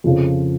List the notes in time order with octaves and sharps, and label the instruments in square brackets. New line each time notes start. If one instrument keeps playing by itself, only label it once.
[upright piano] F2 C#3 F3